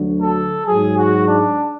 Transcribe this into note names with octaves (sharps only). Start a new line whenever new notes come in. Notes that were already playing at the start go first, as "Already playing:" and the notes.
Already playing: D2 D3 F#3
A4
G#2 F#3 G#4
F#4
D4